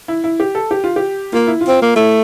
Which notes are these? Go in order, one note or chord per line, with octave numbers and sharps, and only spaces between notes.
E4
E4
G4
A4
G4
F4
G4
A#3 F4
E4
F4
C4
A#3
A3 E4